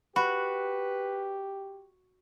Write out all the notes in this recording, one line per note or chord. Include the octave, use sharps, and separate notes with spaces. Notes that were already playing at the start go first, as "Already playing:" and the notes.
F#4 G4 B4 B5